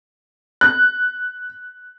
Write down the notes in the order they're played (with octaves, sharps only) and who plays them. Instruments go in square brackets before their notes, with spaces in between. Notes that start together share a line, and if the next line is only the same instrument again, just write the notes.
[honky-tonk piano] F#6